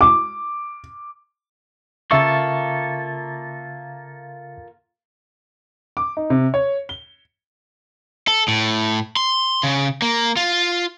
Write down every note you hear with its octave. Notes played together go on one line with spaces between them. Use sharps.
D6
C#3 A#3 F4 A4 E5 C#6
D6
D#4
C3
C#5
G7
A4
A2
C6
C#3
A#3
F4